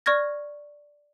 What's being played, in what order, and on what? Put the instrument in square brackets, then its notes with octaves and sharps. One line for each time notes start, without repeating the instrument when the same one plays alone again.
[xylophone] D5 C#6 F6 G#6 A#6